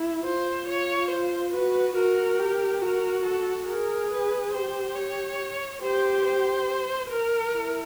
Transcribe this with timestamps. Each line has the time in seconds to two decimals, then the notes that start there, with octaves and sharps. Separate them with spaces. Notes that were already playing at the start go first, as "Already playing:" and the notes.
Already playing: E4
0.25 F4 C5
0.67 F4 C#5
1.11 C5
1.53 F#4 B4
1.96 F#4 A#4
2.39 G4
2.81 F#4 A#4
3.25 A4
3.67 G#4 A#4
4.10 B4
4.54 G4 C5
4.95 C#5
5.82 G4 C5
6.25 C5
7.10 A#4
7.53 E4